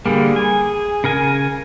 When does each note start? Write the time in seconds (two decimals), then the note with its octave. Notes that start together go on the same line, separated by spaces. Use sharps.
0.06 D3 G3 A#3 G#4
0.36 G#5
1.04 C#3 A#4 G#5